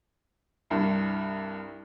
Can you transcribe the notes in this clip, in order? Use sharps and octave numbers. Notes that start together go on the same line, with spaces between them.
C2 G2